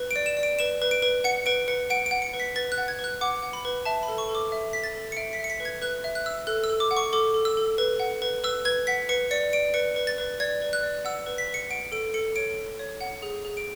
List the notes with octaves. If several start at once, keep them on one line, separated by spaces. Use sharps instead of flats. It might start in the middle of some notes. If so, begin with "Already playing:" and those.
Already playing: B4
D7
D5
E7
D5
D7
B4 E7
B4
D7
B4
F#5 C#7
B4 D7
B4 C#7
F#5 D7
D7
F#5
C#7
B4
B6
B4 A6
F#6
F#5
G#6
B4
F#6
F#5 D6
F#5
B5
B4
E5 A5
B5
A4
C#6
A4
D6
E5
E5 B6
A6
A4
C#7
E5 D7
B6
E5
C#7
B6
B4
G#6
B4 F#6
E5
F#6
E5 E6
A4 F#6
E6
A4
D6
F#5
C#6
A4 D6
A4
E6
A4
B4
F#5
B4
B4 E6
B4 G#6
F#5 B6
B4 C#7
D5 C#7
D5 D7
B4 C#7
B4
A6
B4
D5 G#6
B4
F#6
D5
F#5 E6
B4
B6
B4
C#7
F#5 D7
A4 D7
A4 C#7
C#5 D7
A4
C#5
F#5
G#4
G#4
D7